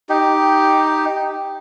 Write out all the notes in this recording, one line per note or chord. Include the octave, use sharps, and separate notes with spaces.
D#4 G4